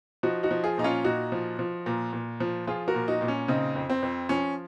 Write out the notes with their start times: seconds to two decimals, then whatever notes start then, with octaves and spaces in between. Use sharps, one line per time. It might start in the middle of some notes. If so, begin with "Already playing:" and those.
0.23 F3 D#4 F#4
0.43 D#4 F#4
0.51 F3
0.64 F4 G#4
0.78 A#2 D#4
0.84 C#4 F4
1.04 A#2 D#4 F#4
1.32 F3
1.59 F3
1.86 A#2
2.13 A#2
2.40 F3
2.67 F3 F4 G#4
2.88 F#4 A#4
2.94 A#2
3.08 D#4 F#4
3.21 A#2
3.28 C#4
3.48 C#3 C4 D#4
3.75 F2
3.90 C4
4.03 F2
4.29 F3 C#4